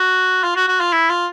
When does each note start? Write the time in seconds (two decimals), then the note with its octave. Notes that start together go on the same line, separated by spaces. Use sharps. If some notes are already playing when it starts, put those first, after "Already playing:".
Already playing: F#4
0.43 F4
0.56 F#4
0.68 F#4
0.80 F4
0.93 E4
1.09 F4